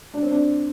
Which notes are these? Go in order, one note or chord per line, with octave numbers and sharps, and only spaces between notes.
D4
C4
D4